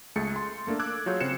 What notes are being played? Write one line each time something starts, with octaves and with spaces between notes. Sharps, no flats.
C#2 A3 G#4 A6 C#7
C6
A3 A#3 D4 A4
D6 E6 F#6 G#6
F#3 F4 G#4 C#5 G6
C#3 C4 C5 F#6 C#7 E7